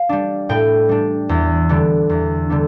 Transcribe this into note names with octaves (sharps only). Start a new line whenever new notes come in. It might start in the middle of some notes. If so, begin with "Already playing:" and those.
Already playing: F5
G3 D4
A2 G5
G3 D4
E2
D3 G3 B3 D4
E2
D3 G3 B3 D4